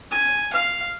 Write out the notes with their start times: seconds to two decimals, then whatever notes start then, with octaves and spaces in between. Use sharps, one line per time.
0.11 G#5
0.54 F5